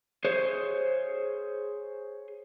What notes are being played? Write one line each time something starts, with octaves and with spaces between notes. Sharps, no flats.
G#4 C5 C#5